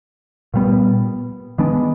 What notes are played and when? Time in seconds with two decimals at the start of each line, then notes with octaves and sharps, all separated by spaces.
0.54 A#2 G3 B3
1.58 D#3 G#3 B3 D4